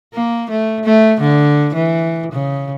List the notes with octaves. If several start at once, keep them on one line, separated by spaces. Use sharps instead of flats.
A#3
A3
A3
D3
E3
C#3